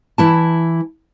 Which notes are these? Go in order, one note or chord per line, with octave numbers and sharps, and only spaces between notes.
E3 E4 A5